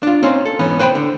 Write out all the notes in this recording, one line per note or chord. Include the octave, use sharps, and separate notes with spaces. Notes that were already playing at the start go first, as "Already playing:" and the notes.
D4 F4
C4 C#4 D#4 C5
A4
G#2 E3 B3 C#4
B4 C5 G5 G#5 B5
D3